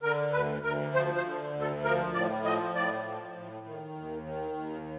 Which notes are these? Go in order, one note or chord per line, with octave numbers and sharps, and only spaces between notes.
D3 A#4
D2 B4
D2 A#4
F3 C5
C5
D3
D2
A4
F3 A#4
A2 D5
F3 D#5
A2 D5
F3
A2
D#3
D#2
D#3
D#2